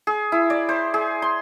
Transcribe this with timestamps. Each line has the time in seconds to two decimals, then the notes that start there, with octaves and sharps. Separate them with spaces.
0.07 G#4
0.32 E4
0.50 D5
0.69 C5
0.94 G#4
1.22 C6